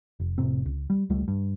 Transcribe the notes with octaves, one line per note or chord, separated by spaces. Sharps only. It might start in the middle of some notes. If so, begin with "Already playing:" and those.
F1
F1 A2 C3 C4
C#2
G3
C#2 G3 A3
G2